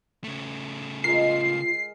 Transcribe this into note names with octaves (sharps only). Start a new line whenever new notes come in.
C#3 A3
G#3 F4 A#4 C7